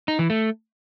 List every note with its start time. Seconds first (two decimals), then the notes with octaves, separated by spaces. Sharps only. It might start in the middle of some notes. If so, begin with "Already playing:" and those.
0.08 D#4
0.19 E3
0.30 A3